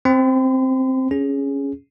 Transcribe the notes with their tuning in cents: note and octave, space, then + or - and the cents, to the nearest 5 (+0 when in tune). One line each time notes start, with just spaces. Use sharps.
C4 +0 C6 -45
C#4 +0 G#4 +0